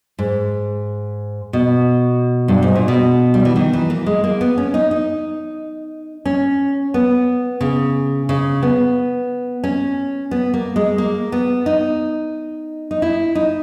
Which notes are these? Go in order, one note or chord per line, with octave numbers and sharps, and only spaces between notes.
G#2
B2
G2
G#2
A#2
B2
G3
E3
D#3
E3
A#3
G#3
A#3
B3
C#4
D#4
D#4
C#4
B3
C#3
C#3
B3
C#4
B3
A#3
G#3
A#3
B3
D#4
D#4
E4
D#4